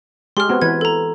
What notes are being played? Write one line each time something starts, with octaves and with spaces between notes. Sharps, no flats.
G#3 G4 G#4 C6 F6
B3 C4 F#4
E3 B4 G#6
A4 A#5